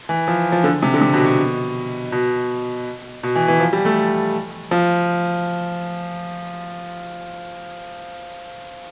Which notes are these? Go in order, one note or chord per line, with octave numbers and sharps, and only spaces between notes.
E3
F3
F3
D3
C3
D3
C3
B2
B2
B2
B2
E3
E3
F3
G3
A3
F3